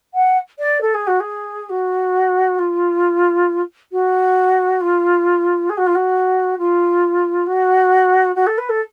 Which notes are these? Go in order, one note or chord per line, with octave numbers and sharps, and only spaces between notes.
F#5
D5
A4
G#4
F#4
G#4
F#4
F4
F#4
F4
G#4
F#4
F4
F#4
F4
F#4
F#4
A4
B4
A4